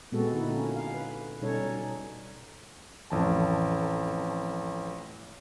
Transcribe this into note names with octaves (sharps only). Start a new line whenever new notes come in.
A#2 G#3 B3 C4 F#4 A4
D3 A#3 D#4 E4
C#4 F#4
F5
B4
B2 G3 C#4 D#4 A4 C#5
A1 F2 A5